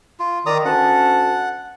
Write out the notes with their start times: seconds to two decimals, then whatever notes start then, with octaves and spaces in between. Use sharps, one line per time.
0.20 F4
0.46 D#3 D5 A#5 D#6
0.65 D2 C#4 F#5 A5